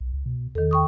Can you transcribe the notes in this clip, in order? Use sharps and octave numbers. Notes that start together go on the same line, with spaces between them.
B1
C#2
B2
E2 D#3 A4
G5 C#6 D#6